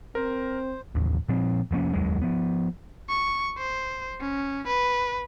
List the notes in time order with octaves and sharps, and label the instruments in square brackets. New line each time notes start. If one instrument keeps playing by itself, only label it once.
[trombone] C4 [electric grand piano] A#4 [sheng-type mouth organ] C5
[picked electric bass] A1 D#2
A#2 F3 C4
F1 F3 A#3 C#4
F1 D#2 F#3 G#3
F3 B3
[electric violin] C#6
C5
C#4
B4